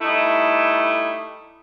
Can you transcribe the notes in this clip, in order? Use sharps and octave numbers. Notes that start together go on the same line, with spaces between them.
G3 A3 D#4 E4